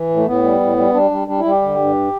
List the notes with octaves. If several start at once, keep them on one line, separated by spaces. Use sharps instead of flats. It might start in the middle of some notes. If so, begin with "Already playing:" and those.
Already playing: E3
A2
A3
A2 B3
G3
A2
G3
G3 D4
G3
G3 D4
E4
G3
G4
D3
G2